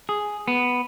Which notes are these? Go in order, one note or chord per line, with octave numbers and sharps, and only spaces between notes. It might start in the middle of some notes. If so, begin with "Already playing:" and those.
G#4
B3